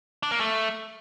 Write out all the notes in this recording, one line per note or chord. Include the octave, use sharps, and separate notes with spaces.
D4
A#3
A3